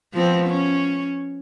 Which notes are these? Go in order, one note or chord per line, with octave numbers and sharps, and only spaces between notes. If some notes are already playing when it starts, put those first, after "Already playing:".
F3 B3 C4
C#4